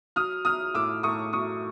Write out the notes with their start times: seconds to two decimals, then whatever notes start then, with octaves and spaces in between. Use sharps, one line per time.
0.16 F#3 D#6 F6
0.45 F#3 D#6 F6
0.74 A2 D6 E6
1.03 A2 C#6 D#6
1.33 F#3 C#6 D#6